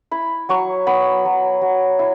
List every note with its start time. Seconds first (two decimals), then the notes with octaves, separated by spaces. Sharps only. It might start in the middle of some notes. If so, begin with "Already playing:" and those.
0.11 E4 B5
0.49 F#3 C#6
0.87 B3 B5
1.25 F#3
1.62 F#3
1.99 E4